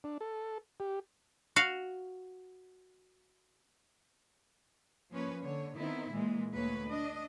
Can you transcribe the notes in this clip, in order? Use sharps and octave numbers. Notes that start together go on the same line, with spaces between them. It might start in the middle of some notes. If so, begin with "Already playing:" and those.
D4
A4
G4
F#4 F5
F3 A#3 C#4 B4 C#5
D3 C#5
D#3 B3 C4 D#4 E4
A#2 E3 G#3 A#3
D2 A3 A#3 B4 C#5
D4 D#5